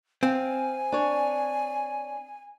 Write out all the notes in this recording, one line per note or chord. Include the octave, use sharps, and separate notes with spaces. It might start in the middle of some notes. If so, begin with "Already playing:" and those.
C4 F5 G#5
D4 C#5